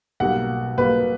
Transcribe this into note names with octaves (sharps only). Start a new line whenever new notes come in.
B1 B2 G3 A#3 F#5
B1 B2 G3 A#3 B4